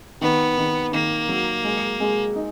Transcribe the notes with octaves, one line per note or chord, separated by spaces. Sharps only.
D#3 B3
D#3
D#3 A#3
F#3
G#3
G#3
D#4